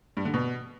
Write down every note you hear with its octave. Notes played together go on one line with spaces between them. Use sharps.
G2
D3
B2